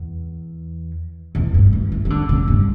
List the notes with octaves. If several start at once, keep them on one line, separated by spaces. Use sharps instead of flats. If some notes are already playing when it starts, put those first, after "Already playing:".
Already playing: E2
E2
G2
E3
E3
E3
D3
C#3
G2